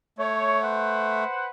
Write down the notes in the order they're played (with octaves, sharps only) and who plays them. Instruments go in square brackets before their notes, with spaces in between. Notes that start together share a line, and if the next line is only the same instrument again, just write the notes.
[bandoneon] A3 [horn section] C#5
[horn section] B4 C5 F#5